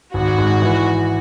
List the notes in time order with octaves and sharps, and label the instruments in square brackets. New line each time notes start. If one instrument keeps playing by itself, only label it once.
[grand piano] G#1 [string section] F#4
[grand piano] G#2
E3